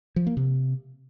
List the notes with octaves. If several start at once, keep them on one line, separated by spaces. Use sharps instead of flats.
F3
A#3
C3